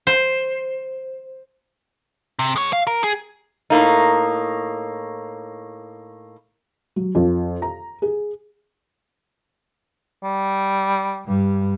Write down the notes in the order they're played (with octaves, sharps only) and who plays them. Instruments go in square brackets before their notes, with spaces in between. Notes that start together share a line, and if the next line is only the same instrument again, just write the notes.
[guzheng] C5
[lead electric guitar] C3
G#3 C#5
F5
A#4
G#4
[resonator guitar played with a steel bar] A2 A#3 D#4
[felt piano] F#3
F2
A#5
G#4
[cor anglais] G3
[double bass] G2 G3